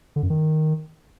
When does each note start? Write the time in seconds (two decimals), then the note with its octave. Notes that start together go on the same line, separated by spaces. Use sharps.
0.16 D3
0.23 F#2
0.30 D#3